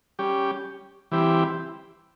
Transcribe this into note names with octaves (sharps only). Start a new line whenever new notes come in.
G3 C#4 G4
E3 G3 C4 E4 G4